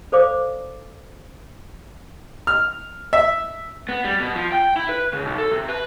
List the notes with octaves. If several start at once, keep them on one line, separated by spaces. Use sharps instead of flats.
A4 C5 D5 F5 D6
F6
E5
B3
G3
B2
F3
G5
E4
B4
C#3
B1
A4
C3
B4